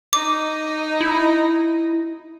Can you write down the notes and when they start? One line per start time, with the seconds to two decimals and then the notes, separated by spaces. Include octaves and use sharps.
0.13 D#4 D#5 D6
1.01 E4